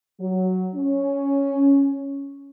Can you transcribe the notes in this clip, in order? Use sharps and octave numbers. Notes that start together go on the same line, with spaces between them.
F#3
C#4